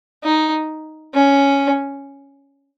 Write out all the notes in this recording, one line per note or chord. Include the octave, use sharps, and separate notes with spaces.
D#4
C#4